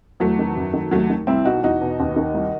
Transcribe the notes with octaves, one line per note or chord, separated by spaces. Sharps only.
E2 F#3 A3
D#3
F#2
D#3
D#2 F#3 A3
D#3
C2 C4 E4
B2 D#4 F#4
E2 D#4 F#4
B2
D#2
D#3
C2